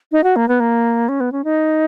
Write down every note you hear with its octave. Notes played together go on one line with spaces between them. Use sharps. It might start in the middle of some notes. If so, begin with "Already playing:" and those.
D#4
F#4
A#3
B3
A#3
C#4
B3
C#4
D#4